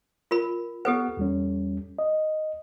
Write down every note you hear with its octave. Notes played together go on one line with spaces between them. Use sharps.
F4 A#4 B5
B3 G4 A4 B4 F#5
E2 G3 C#4
D#5